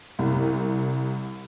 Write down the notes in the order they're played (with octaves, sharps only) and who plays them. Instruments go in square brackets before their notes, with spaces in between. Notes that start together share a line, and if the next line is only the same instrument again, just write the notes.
[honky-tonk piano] C2